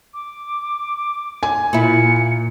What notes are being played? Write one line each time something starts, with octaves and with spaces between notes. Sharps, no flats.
D6
G#5
A#2 E4 C#7